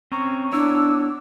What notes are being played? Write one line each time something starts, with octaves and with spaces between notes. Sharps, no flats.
C4 C#4 A#5 C#6
B3 D4 E4 C#5 E6